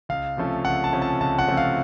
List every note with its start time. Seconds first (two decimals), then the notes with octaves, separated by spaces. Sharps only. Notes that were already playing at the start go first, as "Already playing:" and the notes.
0.09 C#2 F5
0.37 C3 F3 A3 C#4
0.65 C#2 F#5
0.84 A5
0.93 C3 F3 A3 C#4
1.02 A5
1.20 C#2 A5
1.38 F#5
1.48 C3 F3 A3 C#4
1.57 F5